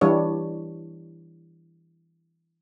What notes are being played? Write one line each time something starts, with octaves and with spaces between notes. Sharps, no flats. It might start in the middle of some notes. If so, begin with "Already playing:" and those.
E3 G3 D4 C#5